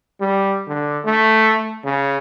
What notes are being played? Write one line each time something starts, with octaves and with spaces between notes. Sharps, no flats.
G3
D3
A3
C#3